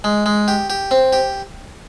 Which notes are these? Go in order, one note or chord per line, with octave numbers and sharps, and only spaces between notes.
G#3
G#3
G4
G4
C4
G4